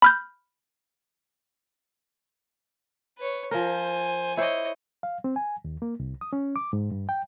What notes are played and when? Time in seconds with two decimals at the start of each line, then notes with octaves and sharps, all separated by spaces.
0.02 B5 F6 G6
3.18 B4 C#5
3.51 F3 A#4 C5 G#5
4.37 E4 C5 C#5 D#5
5.03 F5
5.24 C4
5.36 G#5
5.65 D#2
5.82 A#3
6.00 C2
6.21 D#6
6.33 C#4
6.56 D6
6.73 G#2
6.92 G2
7.09 G5